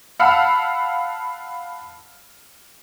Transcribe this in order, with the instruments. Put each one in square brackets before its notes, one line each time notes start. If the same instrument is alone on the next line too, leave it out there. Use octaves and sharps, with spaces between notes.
[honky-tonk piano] F5 F#5 A5 B5 E6 F6